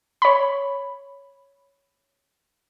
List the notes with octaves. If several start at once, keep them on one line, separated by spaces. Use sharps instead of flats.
C#5 B5